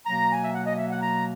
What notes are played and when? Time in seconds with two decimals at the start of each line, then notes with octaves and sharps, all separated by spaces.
0.06 B2 F#3 A#3 A#5
0.31 G#5
0.43 E5
0.53 F#5
0.65 D#5
0.76 E5
0.89 F#5
1.00 A#5